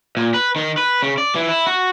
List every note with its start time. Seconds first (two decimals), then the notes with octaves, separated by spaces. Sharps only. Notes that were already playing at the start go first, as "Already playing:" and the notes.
0.17 A#2
0.34 B4
0.56 D#3
0.78 B4
1.03 C#3
1.18 D5
1.36 E3
1.49 E4
1.67 F#4